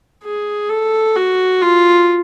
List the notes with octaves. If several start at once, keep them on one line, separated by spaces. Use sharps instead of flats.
G#4
A4
F#4
F4